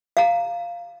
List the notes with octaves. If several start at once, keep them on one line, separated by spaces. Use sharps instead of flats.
F5 A#5